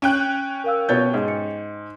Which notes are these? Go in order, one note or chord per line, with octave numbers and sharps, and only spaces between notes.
C#4 G5 F#6
A#4 F5 E6
B2 G4 C#5 G6 A6
G#2
C#7